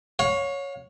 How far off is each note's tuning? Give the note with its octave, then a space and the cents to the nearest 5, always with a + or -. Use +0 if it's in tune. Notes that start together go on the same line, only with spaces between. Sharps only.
C#5 +0 F5 +40